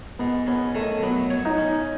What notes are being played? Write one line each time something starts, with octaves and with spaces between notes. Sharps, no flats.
G#2 B3
B3 C#4
D#3 A3
F#3 B3
C#5
D#4
C#4